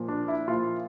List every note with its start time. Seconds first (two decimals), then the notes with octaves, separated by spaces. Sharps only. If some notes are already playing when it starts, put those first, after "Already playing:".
Already playing: A#2 F3
0.08 D4
0.28 E4
0.48 A#2 F3 F4